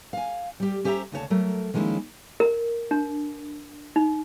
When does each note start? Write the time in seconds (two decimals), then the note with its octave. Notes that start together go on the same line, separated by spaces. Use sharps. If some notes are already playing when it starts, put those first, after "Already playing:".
0.13 F5 G#5
0.60 G3 G4
0.84 C#4 G4 C5 E5 A5 A#5
1.12 D2 C#3 C#5 A5
1.30 F#3 A3 A#4
1.74 D#3 F3 G#3 A#3 C#4 E4
2.40 A#4
2.91 D4
3.96 D#4